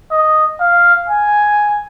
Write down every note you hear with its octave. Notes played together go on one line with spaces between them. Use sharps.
D#5
F5
G#5